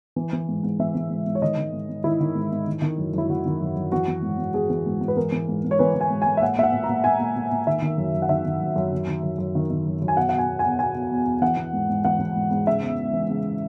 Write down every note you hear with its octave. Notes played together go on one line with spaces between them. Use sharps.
E3
E3
G#2
G#2
E3 E5
E3
G#2
G#2
C#5
D#3 D#5
D#3
G#2
G#2
D#3 E4
D#3
G#2
G#2
D#3
D#3
F#2
F#2 E4
D#3 F#4
D#3
F#2
F#2
E3 F#4
E3
G#2
G#2
E3 G#4
E3
G#2
G#2
B4
E3 A#4
E3
G#2
G#2
C#5
E3 B4
E3
G#5
G#2
G#2 G#5
E5
A#2 F#5
A#2 E5
F#5
A#2
A#2 A#5
A#2 G#5
A#2
A#2
A#2
D#3 E5
D#3
F#2
F#2
F#5
D#3 E5
D#3
F#2
F#2
D#3
D#3
F#2
F#2
D#3
D#3
F#2
F#2
G#5
B2 F#5
F#5
B2
G#5
E2
G#5
E2
B2 G#5
B2
E2
E2
E3 F#5
E3
G#2
G#2
E3 F#5
E3
G#2
G#2
C#3 E5
E2
E2
E3
C#3